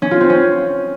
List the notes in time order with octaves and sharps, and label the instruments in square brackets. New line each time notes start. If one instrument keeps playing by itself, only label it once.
[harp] C#4
F4
C4
C#4